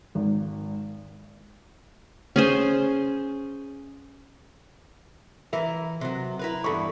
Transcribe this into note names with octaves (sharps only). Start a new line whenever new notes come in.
G#1
C#4 G#4 C5
E3 E4 A#4 E5
C3 F#3
E4 A#4 B4
E2 G2 A4 B5 C#6